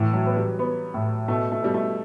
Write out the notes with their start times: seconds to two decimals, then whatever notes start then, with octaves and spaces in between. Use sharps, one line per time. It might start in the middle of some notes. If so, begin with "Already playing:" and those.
Already playing: A2 E3
0.13 F#3
0.26 B3
0.37 G3
0.59 B3
0.94 A2
1.28 B2 A3
1.52 A3
1.62 B2 G3
1.74 A3